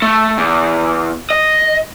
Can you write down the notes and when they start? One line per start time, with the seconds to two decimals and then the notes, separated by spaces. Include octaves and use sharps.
0.02 A3
0.38 E2
1.30 D#5